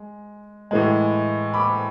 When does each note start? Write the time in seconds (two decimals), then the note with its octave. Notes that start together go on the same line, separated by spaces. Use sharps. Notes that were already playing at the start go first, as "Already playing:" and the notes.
Already playing: G#3
0.71 A2 E3 G#3
1.54 B5 D6